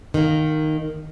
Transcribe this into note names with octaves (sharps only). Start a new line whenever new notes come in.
D#3 A#3